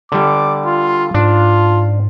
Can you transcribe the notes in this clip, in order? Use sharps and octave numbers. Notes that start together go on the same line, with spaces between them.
D3 G3 D6
F4
G#2 D4 F4